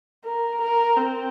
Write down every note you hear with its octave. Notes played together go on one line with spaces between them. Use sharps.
A#4
A#4
C4